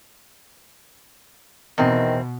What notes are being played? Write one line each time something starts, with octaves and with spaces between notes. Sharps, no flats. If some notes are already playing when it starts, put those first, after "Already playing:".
E2 B2 D#3 C4